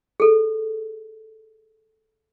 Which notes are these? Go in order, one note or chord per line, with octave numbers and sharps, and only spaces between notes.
G#4 A4